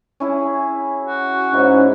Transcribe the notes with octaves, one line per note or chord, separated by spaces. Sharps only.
C#4 E4 G#4
F#4
G#2 C#4 E4 D#5